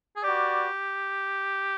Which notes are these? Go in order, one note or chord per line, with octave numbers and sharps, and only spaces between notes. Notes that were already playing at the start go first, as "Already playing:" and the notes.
G#4
F#4 G4 B4 D5